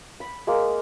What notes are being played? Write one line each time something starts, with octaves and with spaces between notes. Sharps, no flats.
B5
G#3 A#3